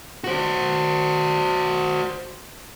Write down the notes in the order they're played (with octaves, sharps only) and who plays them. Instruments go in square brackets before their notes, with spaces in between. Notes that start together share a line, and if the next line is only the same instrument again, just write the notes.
[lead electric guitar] F#4 C5